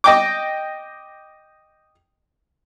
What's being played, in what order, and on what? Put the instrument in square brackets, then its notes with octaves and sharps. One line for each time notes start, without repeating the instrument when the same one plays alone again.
[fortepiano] D#5 G5 D6